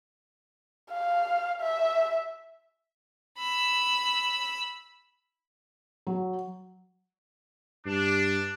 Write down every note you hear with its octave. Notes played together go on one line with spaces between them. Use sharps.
F5
E5
B5 E6
F#3
G2 D4